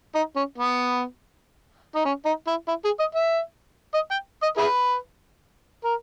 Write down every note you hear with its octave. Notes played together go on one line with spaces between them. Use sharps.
D#4
C#4
B3
D#4
C#4
D#4
E4
E4
G#4
D#5
E5
D#5
G5
D#5
E4 G#4 B4
A#4